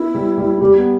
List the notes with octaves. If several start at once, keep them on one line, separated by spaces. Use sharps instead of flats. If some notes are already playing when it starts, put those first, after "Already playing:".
Already playing: B3 E4
G3
G3
G3 G4
B3